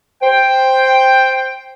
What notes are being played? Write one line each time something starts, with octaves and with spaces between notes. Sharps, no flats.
C5 G5